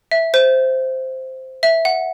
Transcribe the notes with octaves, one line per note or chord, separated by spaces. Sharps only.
E5
C5
E5
F#5